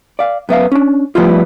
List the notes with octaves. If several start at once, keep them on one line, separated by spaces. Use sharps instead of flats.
D5 F5
F#2 B3 E5 F5
C#4 D4
F3 G3 A3 B3 E4 F4